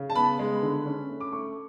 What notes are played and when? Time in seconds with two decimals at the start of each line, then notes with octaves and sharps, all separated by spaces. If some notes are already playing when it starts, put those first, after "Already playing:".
Already playing: C#3
0.10 A5
0.15 B3 B5
0.39 G#3
0.62 D3
0.86 C#4
1.09 A3
1.20 D6
1.32 A3 C#6